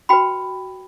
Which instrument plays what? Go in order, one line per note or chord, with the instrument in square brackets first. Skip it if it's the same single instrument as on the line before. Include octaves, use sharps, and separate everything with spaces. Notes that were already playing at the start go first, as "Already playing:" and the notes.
[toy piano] F#4 B4 G5 B5